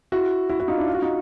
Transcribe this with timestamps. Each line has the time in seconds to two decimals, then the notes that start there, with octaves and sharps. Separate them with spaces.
0.12 E4 F#4
0.49 E4 F#4
0.60 E4 F#4
0.68 D#4 F4
0.78 D4 E4
0.88 F4
0.95 F#4
1.02 D#4 F4